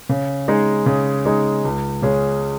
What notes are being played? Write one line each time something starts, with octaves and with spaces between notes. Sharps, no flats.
C#3
G#3 D#4 G#4
C#3
G#3 D#4 G#4
C#2
C#3 G#3 C#4 G#4